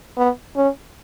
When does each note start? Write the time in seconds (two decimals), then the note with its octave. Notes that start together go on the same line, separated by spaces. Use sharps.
0.17 B3
0.56 C#4